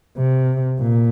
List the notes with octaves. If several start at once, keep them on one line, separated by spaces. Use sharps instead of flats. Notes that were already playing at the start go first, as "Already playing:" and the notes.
C3
A#2